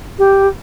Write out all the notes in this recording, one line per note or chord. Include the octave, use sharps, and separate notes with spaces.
G4